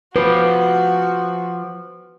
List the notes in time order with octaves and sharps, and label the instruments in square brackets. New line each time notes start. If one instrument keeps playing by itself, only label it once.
[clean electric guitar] F3 G4 [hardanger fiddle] F#4 [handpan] B4